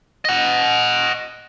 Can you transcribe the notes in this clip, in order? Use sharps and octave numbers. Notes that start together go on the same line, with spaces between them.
D#5 F#5